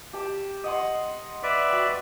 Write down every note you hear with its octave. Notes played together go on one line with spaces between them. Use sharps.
G4 A5
D#5 F#5 C6
B4 D5 E5
F#4 G5